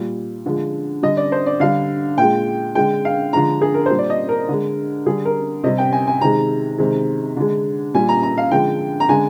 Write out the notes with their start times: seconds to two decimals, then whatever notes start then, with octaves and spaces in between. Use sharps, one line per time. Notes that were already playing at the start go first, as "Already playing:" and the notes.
Already playing: A#2 G3
0.46 D3 F3 G#3
1.03 D3 G3 D#5
1.17 D5
1.32 C5
1.46 D5
1.60 D3 G3 F5
2.18 A#2 G#3 G5
2.75 D3 G#3 G5
3.05 F5
3.33 D3 F3 G#3 A#5
3.61 G#4
3.74 A#4
3.86 C5
3.91 A#2 G3
3.98 D5
4.10 D#5
4.29 A#4
4.49 D3 G#3
5.06 D3 G3 G#4
5.25 A#4
5.64 C3 G3 D#5
5.78 G5
5.92 G#5
6.07 G#5
6.21 C3 D#3 G#3 A#5
6.78 C3 D#3 G#3
7.37 D3 G#3
7.94 A#2 G3 G#5
8.09 A#5
8.23 A#5
8.38 F5
8.51 D3 F3 G#3 G5
9.00 A#5
9.09 D3 G#3 G#5